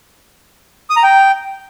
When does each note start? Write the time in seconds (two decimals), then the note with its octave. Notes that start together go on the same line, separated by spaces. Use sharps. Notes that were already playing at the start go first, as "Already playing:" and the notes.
0.90 D#6
0.96 A#5
1.03 G5